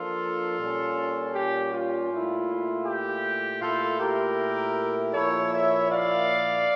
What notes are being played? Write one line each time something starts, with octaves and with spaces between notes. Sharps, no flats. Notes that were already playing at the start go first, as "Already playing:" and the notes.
Already playing: F3 A#3 D4 F4 A4
A#2 G3 C#4
G4
F4
A#2 A3 E4
G4
A#2 A3 E4 F4 A4
G4 A#4
A#2 F3 A#3 E4 A4 C#5
C#5 E5
D5 F5